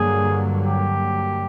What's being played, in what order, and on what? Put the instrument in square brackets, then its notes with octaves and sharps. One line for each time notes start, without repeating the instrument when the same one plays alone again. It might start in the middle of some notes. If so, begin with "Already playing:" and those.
Already playing: [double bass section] G2 D3 F#3 A#3 [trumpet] G#4
[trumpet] G4